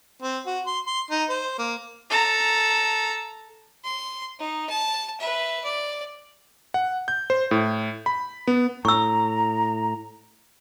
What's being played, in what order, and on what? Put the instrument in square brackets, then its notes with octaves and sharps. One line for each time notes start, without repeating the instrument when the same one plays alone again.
[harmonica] C4
F#4
C6
C6
D#4
C5
A#3
[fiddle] A4 A#5
C6
D#4
A5
B4 E5
D5
[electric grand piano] F#5
G6
C5
A2
B5
B3
[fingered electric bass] A2 [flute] A#5 [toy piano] C#6 E6